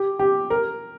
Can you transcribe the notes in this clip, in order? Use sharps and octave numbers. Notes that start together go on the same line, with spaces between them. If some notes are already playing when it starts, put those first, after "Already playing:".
Already playing: G4
G4
A#4